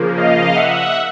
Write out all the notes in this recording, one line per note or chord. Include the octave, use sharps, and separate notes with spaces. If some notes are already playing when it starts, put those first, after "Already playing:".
Already playing: C#3 F3 A#3
D#5 F5
E5 F#5